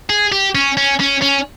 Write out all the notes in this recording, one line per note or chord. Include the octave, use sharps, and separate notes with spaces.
G#4
G4
C#4
C#4
C#4
C#4